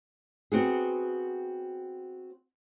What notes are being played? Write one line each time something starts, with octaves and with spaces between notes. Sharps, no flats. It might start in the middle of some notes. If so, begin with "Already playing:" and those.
B3 C4 F#4 G#4